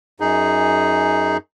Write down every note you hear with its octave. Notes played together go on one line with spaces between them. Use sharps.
F#2 D#4 G#4